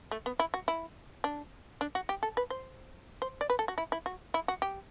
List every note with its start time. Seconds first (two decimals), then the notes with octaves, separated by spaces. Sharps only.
0.11 A3
0.26 B3
0.39 E4
0.54 F#4
0.68 E4
1.24 D4
1.81 D4
1.95 F#4
2.09 G4
2.23 A4
2.37 B4
2.50 C5
3.22 C5
3.41 D5
3.50 B4
3.59 A4
3.68 F#4
3.78 E4
3.92 E4
4.06 F#4
4.34 E4
4.48 F#4
4.62 G4